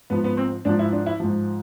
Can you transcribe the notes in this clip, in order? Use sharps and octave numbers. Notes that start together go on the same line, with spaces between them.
G#2 F3 B3
B3
C4
G#2 F3 D4
E4
D4
E4
G#2 F3